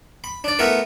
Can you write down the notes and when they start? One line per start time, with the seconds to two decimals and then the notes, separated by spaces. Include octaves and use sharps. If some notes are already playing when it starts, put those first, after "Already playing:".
0.24 B5
0.44 D4 D5
0.59 A3 B3 E4 A#4 B4